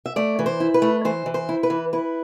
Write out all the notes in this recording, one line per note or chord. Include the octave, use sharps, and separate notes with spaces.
E5
A3 D5
E3
C5
E4
B4
A3
E3 C5
E3
C5
E4
B4
E3
E4 B4